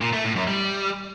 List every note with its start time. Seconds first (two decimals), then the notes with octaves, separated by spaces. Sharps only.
0.01 A#2
0.13 A3
0.24 A2
0.36 F#2
0.47 G3